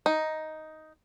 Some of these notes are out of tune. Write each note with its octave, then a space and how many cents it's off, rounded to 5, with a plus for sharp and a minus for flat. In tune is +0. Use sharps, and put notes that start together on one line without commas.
D#4 +5